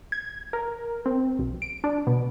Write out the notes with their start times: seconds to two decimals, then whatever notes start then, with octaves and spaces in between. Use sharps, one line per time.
0.12 G#6
0.53 A#4
1.06 C4
1.39 B1
1.62 D7
1.84 D4
2.07 B2